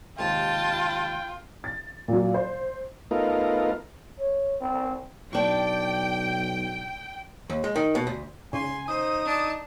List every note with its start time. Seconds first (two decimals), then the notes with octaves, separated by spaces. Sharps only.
0.19 D#2 G#2 C3 F4 G5 A5
1.64 A6
2.08 A#2 F#3
2.34 C5
3.11 A3 B3 D#4 F4 A#4
4.19 C#5
4.61 C4
5.33 B1 D4 G5 C#6
7.50 D#2
7.64 G#3
7.76 D#3
7.95 B2
8.07 D2
8.53 C#3 G#5 C6
8.88 D#4 C5 D#6
9.25 D4 A5